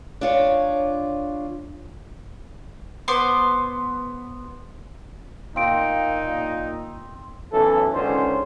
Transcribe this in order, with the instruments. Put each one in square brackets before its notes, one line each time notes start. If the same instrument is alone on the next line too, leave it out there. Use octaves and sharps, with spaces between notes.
[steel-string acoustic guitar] D4 F4 C#5
[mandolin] B3 C5 C6 D6
[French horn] A#2 [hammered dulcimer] C4 [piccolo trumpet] D#4 [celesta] F5 D7
[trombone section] B1 E3 C#4 A4
C#2 D3 D#3 C#4 C5